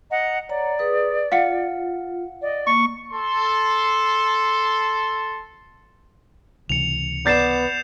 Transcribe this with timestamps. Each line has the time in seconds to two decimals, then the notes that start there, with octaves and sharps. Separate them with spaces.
0.10 D#5 F#5 A#5
0.49 C#5 D5 F#5 A#5
0.79 G#4 B4 D#6
1.32 F4 F5 F#5 C#7
2.41 D5 D#5
2.67 A#3 C#6
3.11 A4 C6
6.69 C#2 C3 E3 C#7 F7
7.26 B3 D5 G6 A6 C7 E7